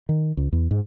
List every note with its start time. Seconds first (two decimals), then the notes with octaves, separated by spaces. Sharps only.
0.09 D#3
0.37 C#2
0.52 E2
0.71 G#2